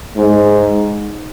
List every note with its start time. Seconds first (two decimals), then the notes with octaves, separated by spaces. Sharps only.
0.16 G#2